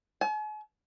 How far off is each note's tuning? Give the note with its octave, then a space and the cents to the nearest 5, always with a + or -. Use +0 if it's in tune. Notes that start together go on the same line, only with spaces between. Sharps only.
G#5 +45